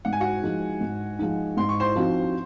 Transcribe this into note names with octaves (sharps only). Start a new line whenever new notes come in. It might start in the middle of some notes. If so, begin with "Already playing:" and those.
G#2 F#5
G#5
F#4 F#5
F3 G#3 D#4
G#2
F3 G#3 D#4
G#2 C6
C#6
C5 C6
F3 C4 D#4 F#4